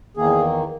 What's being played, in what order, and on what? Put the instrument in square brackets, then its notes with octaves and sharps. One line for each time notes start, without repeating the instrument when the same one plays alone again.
[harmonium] E2 D#3 A#3 G#4